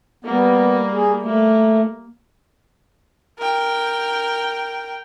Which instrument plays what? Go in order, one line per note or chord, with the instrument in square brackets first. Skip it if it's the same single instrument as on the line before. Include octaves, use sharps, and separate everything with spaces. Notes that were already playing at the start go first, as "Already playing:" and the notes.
[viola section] G3 A#3 [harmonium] B3
[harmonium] G#4
[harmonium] A3 [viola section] A#3
[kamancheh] A#4 G5